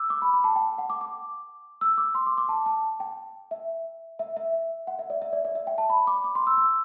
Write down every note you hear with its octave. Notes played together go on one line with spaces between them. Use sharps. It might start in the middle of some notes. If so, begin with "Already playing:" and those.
Already playing: D6 E6
D6
B5
B5
A5
G5
F#5
D6
D6
E6
D6
C6
D6
D6
A5
A5
G5
E5
E5
E5
F#5
E5
D5
E5
D5
D5
E5
G5
A5
B5
D6
D6
C6
E6
E6